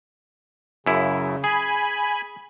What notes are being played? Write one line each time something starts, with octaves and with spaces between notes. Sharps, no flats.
F#2 C#3 E4
G#4 G#5 B5